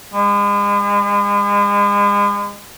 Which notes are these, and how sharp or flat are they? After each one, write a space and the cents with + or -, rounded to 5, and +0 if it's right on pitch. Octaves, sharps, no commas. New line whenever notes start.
G#3 -40